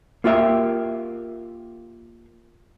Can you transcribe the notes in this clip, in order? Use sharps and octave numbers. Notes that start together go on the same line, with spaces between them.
A#3 F4 G4 E5